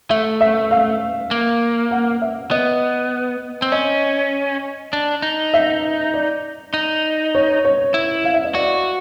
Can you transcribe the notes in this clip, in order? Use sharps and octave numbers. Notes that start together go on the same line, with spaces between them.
A3 E5
E5
F5
A#3
F#5
E5
B3 D#5
C4
C#4 D#5
D4
D#4
E5
D5
D#4
C#5
C#5
E4
F5
E5
D#5
F#4 D5